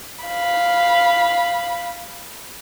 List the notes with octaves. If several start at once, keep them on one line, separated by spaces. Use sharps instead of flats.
F5 B5